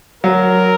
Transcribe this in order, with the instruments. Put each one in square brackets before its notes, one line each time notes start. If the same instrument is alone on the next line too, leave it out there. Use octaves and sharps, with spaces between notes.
[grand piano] F#3 [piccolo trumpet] A#4